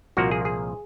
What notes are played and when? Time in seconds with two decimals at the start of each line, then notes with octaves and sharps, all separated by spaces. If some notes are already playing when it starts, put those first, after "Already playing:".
0.17 C2 A#2 F3 A#3 F#4
0.31 G#4
0.45 G#4